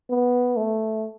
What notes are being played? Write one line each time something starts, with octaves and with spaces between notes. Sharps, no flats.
B3
A3